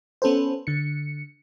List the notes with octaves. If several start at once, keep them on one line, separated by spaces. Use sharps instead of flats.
B3 C#4 A4 B4 C5
D3 C#7